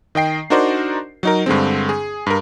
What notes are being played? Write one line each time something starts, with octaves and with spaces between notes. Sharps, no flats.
D#3 D#5 G5 C7
D4 D#4 F#4 A#4 C5 D5
F#3 D#4 A#4
G2 D3 G#3 C4
G#4
G2 A#4